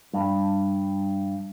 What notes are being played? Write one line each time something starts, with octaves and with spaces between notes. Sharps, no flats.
G2